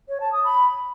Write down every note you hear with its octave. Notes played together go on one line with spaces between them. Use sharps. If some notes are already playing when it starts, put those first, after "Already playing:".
C#5
A5
D#6
B5